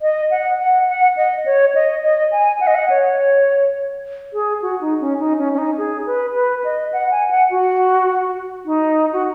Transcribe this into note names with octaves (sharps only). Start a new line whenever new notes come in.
D#5
F#5
F#5
F#5
D#5
C#5
D#5
D#5
G#5
F#5
D#5
F#5
C#5
G#4
F#4
D#4
C#4
D#4
C#4
C#4
D#4
G#4
B4
B4
D#5
F#5
G#5
F#5
F#4
D#4
F#4